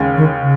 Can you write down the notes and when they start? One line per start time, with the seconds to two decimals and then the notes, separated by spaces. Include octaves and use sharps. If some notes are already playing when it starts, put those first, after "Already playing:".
Already playing: D#2 C#3 G#3 C#4
0.17 D#3
0.40 C#3